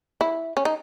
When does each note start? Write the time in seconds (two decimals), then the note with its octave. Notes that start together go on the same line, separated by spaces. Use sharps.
0.21 E4
0.57 C#4
0.65 D#4